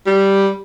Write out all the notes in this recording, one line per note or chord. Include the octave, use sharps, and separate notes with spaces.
G3